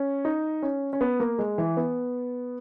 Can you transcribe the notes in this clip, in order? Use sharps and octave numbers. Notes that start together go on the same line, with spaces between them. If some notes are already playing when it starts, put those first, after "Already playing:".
Already playing: C#4
D#4
C#4
C#4
B3
A#3
G#3
E3
B3